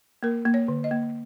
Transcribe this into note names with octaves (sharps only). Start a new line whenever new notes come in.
A#3 A#4
A#3
C#5
D3
D#5
A#3